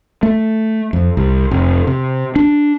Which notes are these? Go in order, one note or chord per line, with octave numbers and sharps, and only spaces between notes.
A3
F2
C2
F1
C3
D4